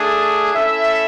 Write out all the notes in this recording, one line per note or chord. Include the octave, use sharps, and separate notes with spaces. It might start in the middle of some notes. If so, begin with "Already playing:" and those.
Already playing: A3 D4 G#4
C#4 E4 A4 E5